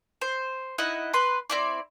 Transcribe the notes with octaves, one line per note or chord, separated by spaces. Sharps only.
C5
D#4 E4 D#5 F#5
B4 C6
C4 E4 D5